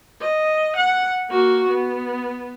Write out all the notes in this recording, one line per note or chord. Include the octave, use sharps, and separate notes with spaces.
D#5
F#5
A#3 F#4
B3